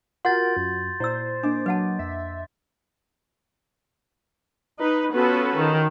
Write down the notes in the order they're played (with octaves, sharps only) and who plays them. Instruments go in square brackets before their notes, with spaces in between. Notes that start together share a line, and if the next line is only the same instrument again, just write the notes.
[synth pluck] F4 F#4 [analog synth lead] A#4 [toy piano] F#5 [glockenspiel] C6 G6 A6
[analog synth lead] F#2
[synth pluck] A#2 [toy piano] E4 D5 E6 [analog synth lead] C5
[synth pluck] A#3 D#5 D6 [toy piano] D4
[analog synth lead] F#3 [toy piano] B4 F#5 A5
[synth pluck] F2 [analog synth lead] E5
[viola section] D#4 B4
B3 C#4 F4 F#4 A4 B4
D#3